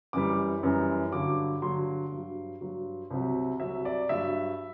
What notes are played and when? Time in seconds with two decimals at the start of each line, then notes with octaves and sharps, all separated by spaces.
0.13 F#2 E3 G3 D6
0.63 F#2 E3 G3
1.12 G2 D3 F#3 D6
1.62 G2 D3 F#3 C6
2.12 G2 F#3
2.61 G2 F#3
3.10 C2 C3 F#3
3.59 C2 C3 F#3 E5
3.85 D5
4.09 G2 F#3 E5